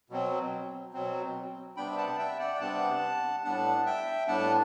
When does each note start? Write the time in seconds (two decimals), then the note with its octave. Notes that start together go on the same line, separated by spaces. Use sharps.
0.10 B2 F#3 C4
0.93 B2 F#3 C4
1.77 C3 G3 B3 D4 G5 B5
1.98 F#5 A5
2.18 E5 G5
2.39 D5 F#5
2.55 G5
2.61 C3 G3 B3 D4 F#5 A5
3.44 A2 G3 B3 D4 F#5 A5
3.86 E5 G5
4.27 A2 G3 B3 D4 F#5 A5